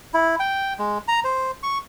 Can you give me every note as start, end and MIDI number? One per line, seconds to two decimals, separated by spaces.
0.14 0.35 64
0.39 0.74 79
0.79 0.98 56
1.08 1.20 82
1.24 1.51 72
1.63 1.78 85